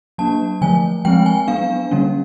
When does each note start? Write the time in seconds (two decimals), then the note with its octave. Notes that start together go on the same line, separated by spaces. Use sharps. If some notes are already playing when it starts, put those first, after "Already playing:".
0.18 F#3 A#3 D4 A5
0.61 D3 F3 A3 G#5
1.05 F3 G#3 C4 G5
1.26 G#5
1.47 F#3 B3 D4 F5
1.91 D3 G3 A#3 C#4